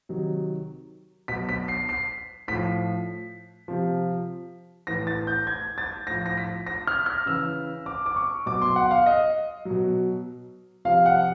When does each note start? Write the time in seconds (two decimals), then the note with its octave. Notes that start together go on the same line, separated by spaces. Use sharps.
0.09 C3 D#3 F#3
1.28 B2 F#3 B6
1.49 B6
1.68 C7
1.89 C7
2.48 A2 F3 B6
3.68 C3 F3
4.87 A2 E3 A#6
5.07 A6
5.27 G6
5.47 G#6
5.78 A6
6.07 A2 F3 A#6
6.26 A#6
6.37 B6
6.67 A#6
6.87 F6
7.06 F6
7.26 C#3 E3 E6
7.86 D6
8.06 D6
8.16 C#6
8.46 B2 F#3 D6
8.62 C6
8.76 F#5
8.91 F5
9.06 D#5
9.65 B2 F#3
10.85 C3 F3 F5
11.06 F#5